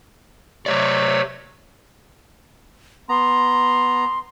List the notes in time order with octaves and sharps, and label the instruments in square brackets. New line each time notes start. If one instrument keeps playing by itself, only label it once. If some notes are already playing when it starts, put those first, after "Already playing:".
[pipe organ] C3 F#3 A3 [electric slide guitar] C#5 D5
[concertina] B3 A#5 [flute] C6